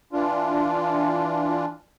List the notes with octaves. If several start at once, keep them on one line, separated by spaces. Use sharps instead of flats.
E3 D4 F4